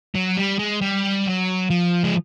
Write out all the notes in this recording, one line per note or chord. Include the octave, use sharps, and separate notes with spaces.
F#3
G3
G#3
G3
F#3
F3
G#3